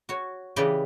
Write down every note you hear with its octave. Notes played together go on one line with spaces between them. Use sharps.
F#4 C#5
C#3 E3 G4 B4 D5 D#5